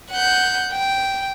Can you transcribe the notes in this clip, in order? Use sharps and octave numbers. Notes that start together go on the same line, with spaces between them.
F#5 G6
G5